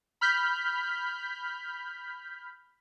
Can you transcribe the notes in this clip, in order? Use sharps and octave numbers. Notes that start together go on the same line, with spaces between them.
B5 F6 G6 B6